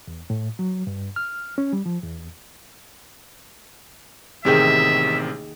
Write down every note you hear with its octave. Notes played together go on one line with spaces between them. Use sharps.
E2
A2
F#3
G2
F6
C#4
G3
F3
E2
A1 D#2 C3 D#3 G#4 E5 G5